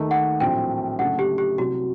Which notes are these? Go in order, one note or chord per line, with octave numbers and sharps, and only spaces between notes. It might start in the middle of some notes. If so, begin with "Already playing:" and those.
Already playing: D#2 D#3 A3 D#4
F#5
A#1 A2 F#3 C4 G5
F#1 F#2 D3 A3 F#5
G4
G4
C2 C3 F#3 F#4